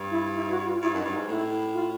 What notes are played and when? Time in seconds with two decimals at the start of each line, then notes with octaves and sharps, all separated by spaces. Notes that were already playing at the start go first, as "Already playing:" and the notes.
Already playing: G2
0.11 E4
0.35 E4
0.50 F#4
0.66 F4
0.82 G2 E4
0.94 F#2 D#4
1.05 G2
1.12 D#4
1.16 G#2
1.28 A2 E4
1.74 F4